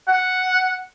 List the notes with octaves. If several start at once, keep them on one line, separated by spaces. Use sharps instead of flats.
F#5